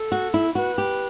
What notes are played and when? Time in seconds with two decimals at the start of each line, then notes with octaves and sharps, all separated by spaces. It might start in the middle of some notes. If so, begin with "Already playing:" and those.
Already playing: A4
0.12 F#4
0.34 E4
0.55 F#4 B4
0.78 G4